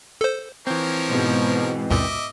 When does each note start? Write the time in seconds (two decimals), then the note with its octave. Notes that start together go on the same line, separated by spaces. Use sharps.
0.21 A4 C5
0.67 E3 F3 C4 A#4 C#5
1.09 G#2 B2
1.91 C#2 F#2 A#2 D#5 E5 D6